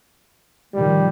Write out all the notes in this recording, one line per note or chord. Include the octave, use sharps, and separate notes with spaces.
A#2 D#3 F3 G3